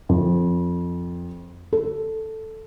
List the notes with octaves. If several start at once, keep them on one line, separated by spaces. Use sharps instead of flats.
F2
A4